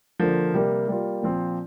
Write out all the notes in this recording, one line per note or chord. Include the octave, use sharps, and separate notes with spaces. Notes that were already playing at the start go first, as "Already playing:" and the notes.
D3 F3 A#3
C3 G3 A#3
G3 A#3 F4
A#2 F3 C4